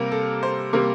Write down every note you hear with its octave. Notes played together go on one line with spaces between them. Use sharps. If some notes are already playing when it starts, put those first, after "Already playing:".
Already playing: C3 G3 A#3 A#4
A4
C5
C3 G3 A#3 A#4